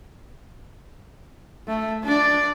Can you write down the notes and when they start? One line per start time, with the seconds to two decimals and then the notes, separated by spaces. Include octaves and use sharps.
1.67 A3
2.04 D4 D5